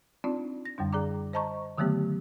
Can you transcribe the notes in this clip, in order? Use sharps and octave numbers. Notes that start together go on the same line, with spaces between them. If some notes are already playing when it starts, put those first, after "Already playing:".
C4 D4 D#4 F4 D5 A5
A#6
F#2 D3 G3 D4
G#4 D5 A#5 D6
C5 D#5 A5 A#5 C#6
D3 D#3 F#3 A3 B3 G4